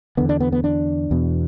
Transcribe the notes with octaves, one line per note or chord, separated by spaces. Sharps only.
E2 D3 B3
D4
B3
B3
D4
E2 B2